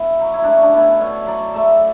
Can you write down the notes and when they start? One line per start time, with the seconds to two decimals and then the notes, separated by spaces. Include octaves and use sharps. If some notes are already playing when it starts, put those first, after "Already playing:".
Already playing: B2 E4
0.20 F#3
0.34 E4
0.44 A3 D4
0.52 C#4
0.63 D4
0.74 B2 E4
1.00 B2 C#5
1.27 F#3 D5
1.54 A3 E5